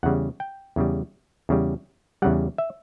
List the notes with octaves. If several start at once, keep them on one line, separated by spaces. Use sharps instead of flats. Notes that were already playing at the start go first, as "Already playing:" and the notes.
E2 C#3 G3 F#5
G5
E2 C#3 G3
E2 C#3 G3
E2 C#3 G3 F#5
E5